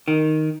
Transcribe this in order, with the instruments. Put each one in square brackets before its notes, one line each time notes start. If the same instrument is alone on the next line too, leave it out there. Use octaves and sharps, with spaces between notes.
[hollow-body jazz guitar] D#3